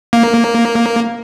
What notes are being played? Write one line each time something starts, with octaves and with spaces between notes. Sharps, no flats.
A#3